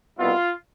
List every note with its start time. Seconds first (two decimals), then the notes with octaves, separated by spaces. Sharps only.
0.19 C2 B2 G3 B3 E4 F4